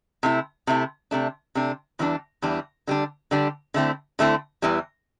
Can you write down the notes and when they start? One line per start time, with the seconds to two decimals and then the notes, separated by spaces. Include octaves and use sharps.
0.23 C3 A3 E4
0.67 C3 A3 E4
1.11 C3 A3 D4
1.55 C3 A3 D4
1.99 E2 E3 G3 D4
2.42 E2 E3 G3 D4
2.87 D3 G3 D4
3.31 D3 G3 D4
3.74 D3 A3 C4 E4
4.19 D3 A3 C4 E4
4.62 E2 E3 G3